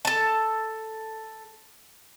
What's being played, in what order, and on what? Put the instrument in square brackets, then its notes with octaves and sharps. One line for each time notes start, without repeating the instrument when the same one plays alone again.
[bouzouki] A4 A5